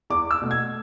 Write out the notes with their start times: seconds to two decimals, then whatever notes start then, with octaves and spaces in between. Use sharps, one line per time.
0.10 E2 D6
0.31 E6
0.42 B2 A3
0.51 G#6